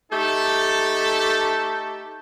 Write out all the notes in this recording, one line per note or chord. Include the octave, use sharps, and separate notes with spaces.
A3 D#4 G4 A4